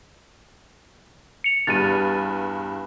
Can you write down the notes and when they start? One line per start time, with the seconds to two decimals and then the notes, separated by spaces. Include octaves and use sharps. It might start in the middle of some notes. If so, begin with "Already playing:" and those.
1.44 C#7 F7
1.67 E2 G2 A6 D#7